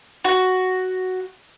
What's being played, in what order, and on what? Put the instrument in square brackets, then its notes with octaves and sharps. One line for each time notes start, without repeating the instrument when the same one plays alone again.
[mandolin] F#4